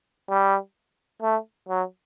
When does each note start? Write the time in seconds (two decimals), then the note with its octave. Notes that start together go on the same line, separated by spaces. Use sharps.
0.29 G3
1.22 A3
1.69 F#3